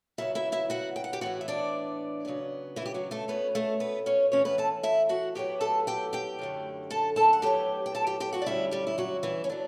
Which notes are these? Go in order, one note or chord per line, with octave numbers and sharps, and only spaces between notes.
C#3 F#3 B3 E4 E5
E4 E5
E4 E5
F#4 F#5
G5
F#5
G4 G5
A2 E3 B3 F#4 F#5
E5
D4 D5
C#3 F#3 B3
E3 E4
G4
F#3 F#4
A3 A4
B2 A3 B3 C#4 B4
A3 A4
B3 B4
C#4 C#5
A2 E3 B3 C#4 C#5
B3 B4
A4 A5
E4 E5
F#4 F#5
A2 F#3 B3 G4 G5
A4 A5
G4 G5
G4 G5
F#2 D3 A3
A4 A5
A4 A5
F#5
A2 F#3 B3 G4 G5
G5
A4 A5
G4 G5
G4 G5
F#4 F#5
D5
G2 D3 G3 C#4 E4 E5
G3 G4
E4
F#3 F#4
E3 E4
C#4
F#3 A3 D4